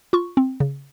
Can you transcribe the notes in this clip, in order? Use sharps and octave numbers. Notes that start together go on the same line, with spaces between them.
F4 C#6
C4
C#3